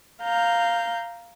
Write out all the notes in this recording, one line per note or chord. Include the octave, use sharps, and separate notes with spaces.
F5 A#5 G6